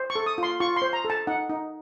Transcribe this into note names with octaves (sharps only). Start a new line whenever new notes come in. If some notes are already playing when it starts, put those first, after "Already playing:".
Already playing: C5
C#6
A4
D#6
F4 C6
F4 C#6
C6
C5
A#5
A4
A5
D#4 F#5
D#4